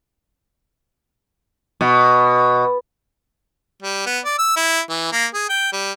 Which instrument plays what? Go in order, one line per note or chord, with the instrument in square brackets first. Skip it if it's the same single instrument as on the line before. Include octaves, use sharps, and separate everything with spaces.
[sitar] B2
[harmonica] G3
B3
D5
E6
E4
E3
A#3
G#4
G5
G3